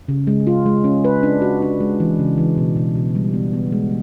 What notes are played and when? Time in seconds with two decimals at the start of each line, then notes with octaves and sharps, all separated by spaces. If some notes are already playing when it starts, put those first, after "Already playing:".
0.08 C#3
0.27 G#3
0.47 F4
0.66 G#3
0.84 C#4
1.05 B4
1.23 D4
1.42 F#4
1.62 D4
1.80 G#3
2.00 E3
2.19 C#3
2.38 E3
2.57 B2
2.76 B2
2.96 B2
3.15 G3
3.34 B3
3.53 B3
3.72 G#3